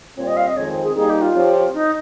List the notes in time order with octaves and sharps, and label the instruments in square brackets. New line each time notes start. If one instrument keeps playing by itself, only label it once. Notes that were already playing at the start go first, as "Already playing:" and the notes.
[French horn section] A#2 G3 C4 [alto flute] C#5
[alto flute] D#5
F5
D#5
[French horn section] F2 D#3 G#3 C4 [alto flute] C#5
[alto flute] G#4
[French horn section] G3 A#3 D#4 [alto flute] G#4
[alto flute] G4
F4
[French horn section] F3 C4 G4 C#5
[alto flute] D#4